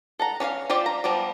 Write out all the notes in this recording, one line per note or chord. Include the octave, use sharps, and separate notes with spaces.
A4 F#5 A#5
C#4 D4 C#5 F5
F4 G4 C5 D5
A#5
F3 G3 B3 D5